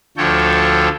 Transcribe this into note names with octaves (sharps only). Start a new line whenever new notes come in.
D2 D3 F3 A4 C#5 G5